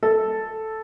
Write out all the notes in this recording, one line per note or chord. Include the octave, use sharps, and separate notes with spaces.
A4